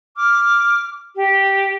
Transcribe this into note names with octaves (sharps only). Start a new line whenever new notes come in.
D6 F6
G4